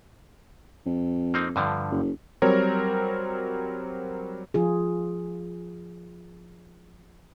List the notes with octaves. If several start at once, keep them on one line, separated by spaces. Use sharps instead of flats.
F2
A#3 C4 D#4
G2 D3 F3
F#1
F#3 G3 C4 A#4 C#5
F3 F4 G#4